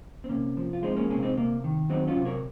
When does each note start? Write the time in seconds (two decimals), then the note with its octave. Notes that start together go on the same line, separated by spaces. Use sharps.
0.24 C4
0.29 C3 A#3 C#4
0.57 F3
0.73 F4
0.82 G#3 C4 D#4
0.96 A#3 C#4
1.10 C3 A#3 C#4
1.23 C4 D#4
1.37 C3 A#3
1.64 D#3
1.90 F#3 C4 D#4
2.07 C#4 F4
2.16 C3
2.25 A#4 C#5